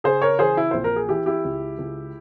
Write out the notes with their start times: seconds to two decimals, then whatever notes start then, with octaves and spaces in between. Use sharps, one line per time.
0.04 C#3 G#4 C5
0.22 A#4 C#5
0.39 E3 G#4 C5
0.57 E4
0.71 A#1 C5
0.84 A#4
0.96 G#4
1.09 E3 E4 G4
1.26 E4 G4
1.45 C#2
1.79 C#2